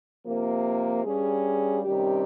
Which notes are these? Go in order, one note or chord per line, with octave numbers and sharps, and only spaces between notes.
C3 F3 A#3
G2 G3 C#4 G#4
C3 D#3 G3 C#4 G4